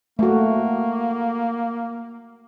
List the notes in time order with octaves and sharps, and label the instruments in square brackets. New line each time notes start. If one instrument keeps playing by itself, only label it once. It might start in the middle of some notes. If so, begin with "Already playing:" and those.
[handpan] A3 F#4 [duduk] A#3